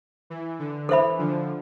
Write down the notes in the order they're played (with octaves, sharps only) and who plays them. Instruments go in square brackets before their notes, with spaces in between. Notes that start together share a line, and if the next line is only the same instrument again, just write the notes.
[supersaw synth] E3
D3
[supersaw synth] E3 [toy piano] A4 C5 E5 B5
[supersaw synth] D3 F3